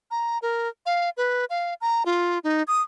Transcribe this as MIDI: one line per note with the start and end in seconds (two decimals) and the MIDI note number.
0.11 0.38 82
0.42 0.69 70
0.86 1.10 77
1.17 1.45 71
1.50 1.74 77
1.81 2.03 82
2.06 2.39 65
2.44 2.63 63
2.68 2.82 87